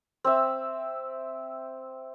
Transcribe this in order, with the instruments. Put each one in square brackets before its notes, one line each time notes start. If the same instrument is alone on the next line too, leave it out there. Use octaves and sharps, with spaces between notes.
[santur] C4 E5